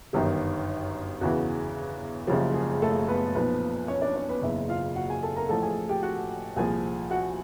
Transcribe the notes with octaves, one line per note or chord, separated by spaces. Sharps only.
G1 F#2 D#3 G4
E2 C#3 E3 F#4
F#1 F#2 C#3 F3 G4
G#3 G#4
A3 A4
B3 B4
B1 A#2 F3 B3 B4
C#4 C#5
D4 D5
C#4 C#5
B3 B4
F#1 E2 C#3 E3 E4 E5
F4 F5
F#4 F#5
G#4 G#5
A4 A5
A#4 A#5
A1 A2 F3 A4 A5
G#4 G#5
G4 G5
F#4 F#5
C2 A#2 F3 G#4 G#5
F#4 F#5